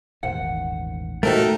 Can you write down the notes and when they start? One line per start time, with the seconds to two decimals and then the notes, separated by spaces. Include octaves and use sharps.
0.23 E1 A1 D#3 C5 F#5
1.23 A#2 A3 D#4 F#4 A4 A#4 C5 G5